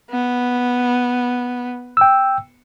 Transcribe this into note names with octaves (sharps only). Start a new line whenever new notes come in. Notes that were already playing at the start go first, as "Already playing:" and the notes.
B3
G5 E6